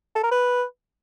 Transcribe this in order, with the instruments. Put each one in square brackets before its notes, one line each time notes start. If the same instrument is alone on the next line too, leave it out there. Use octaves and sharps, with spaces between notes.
[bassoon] A4
A#4
B4